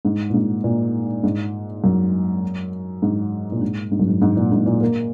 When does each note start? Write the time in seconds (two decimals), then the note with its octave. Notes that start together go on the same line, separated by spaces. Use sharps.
0.05 G#2
0.30 A#2
0.34 G#2
0.64 A#2
1.23 G#2
1.84 F#2
3.02 G#2
3.52 A#2
3.62 G#2
3.92 G#2
4.00 F#2
4.08 G#2
4.22 G#2
4.37 A#2
4.52 G#2
4.66 A#2
4.81 A#3